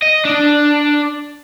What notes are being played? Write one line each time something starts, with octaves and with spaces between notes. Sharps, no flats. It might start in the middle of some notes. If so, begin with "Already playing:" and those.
D#5
D4